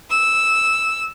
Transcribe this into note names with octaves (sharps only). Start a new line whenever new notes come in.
E6